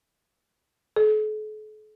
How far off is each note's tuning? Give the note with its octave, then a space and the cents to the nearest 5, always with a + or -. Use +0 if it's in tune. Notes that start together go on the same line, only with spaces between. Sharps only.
A4 -45